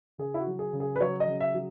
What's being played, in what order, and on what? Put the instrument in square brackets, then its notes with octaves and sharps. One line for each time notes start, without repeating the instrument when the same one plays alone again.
[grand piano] C#3 G#4
E4
F#4
F#3
G#4
C#3
G#4
B4
F#3 C#5
D#5
C#3
E5
F#3